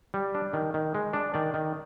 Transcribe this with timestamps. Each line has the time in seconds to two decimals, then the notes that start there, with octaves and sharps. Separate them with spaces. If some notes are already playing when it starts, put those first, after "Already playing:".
0.14 G3
0.35 D4
0.53 D#3
0.74 D#3
0.95 G#3
1.13 D4
1.34 D#3 D5
1.54 D#3